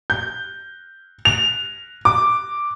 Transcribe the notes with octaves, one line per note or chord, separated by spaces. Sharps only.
G6
F7
D6